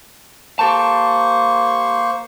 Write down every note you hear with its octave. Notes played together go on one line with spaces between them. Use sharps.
A#3 G4 A4 C5 A5 C#6